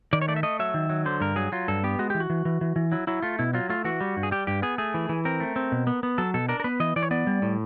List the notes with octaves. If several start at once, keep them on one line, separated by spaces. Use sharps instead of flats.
D#3 D5
C#5
A3 D5
E5
A3 D#5
F#3 E5
D#3
F#3
D3 C5
G2 A#4
F#3 G#4
F#3 F4
G2 A4
B3 G4
G#3 F#4
E3 G4
F#4
E3
E3
E3
E3
F#3 E4
F#3 E4
A3 F4
B2 E4
F#3 F4
A3 F4
E3 F#4
G3
G2
G#4
G3 G4
G2 G4
B3 G#4
A3 G#4
E3
E3
C4 A#4
A3
C4
B2
B3
B3
F#3 A4
B2 A4
D4 A#4
A#4
B3 B4
E3 D#5
E3 D5
C#5
B3 D5
G3
A2